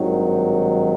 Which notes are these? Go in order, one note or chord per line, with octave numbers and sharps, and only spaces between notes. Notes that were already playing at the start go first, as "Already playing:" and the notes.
Already playing: G#1 G2 D#3 F#3